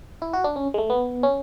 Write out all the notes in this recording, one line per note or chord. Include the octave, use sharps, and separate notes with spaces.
E4
F#4
D4
C#4
G#3
A3
B3
C#4